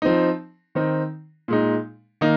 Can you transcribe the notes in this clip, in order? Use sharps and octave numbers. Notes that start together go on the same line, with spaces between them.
F3 C4 D#4
D#3 C4 D#4
A#2 G#3 D#4
D#3 A#3 D#4